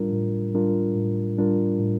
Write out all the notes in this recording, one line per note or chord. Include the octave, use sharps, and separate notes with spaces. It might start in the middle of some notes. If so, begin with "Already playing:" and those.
Already playing: A2 G3 D4 F4 A#4
A2
G3 D4 F4 A#4
A2
G3 D4 F4 A#4
A2